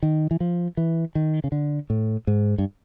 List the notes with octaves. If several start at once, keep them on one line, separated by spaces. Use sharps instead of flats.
D#3
E3
F3
E3
D#3
C#3
D3
A2
G#2
G2